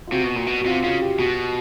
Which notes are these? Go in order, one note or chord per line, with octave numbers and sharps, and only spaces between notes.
F4
C3 F#4
B2
A#2
B2
F#4
C3 F4
C#3 F4
G4
B2 F#4